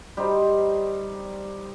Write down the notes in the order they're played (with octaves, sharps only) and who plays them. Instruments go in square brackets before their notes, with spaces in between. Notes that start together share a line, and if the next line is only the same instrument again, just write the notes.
[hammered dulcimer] G3 D#4 C5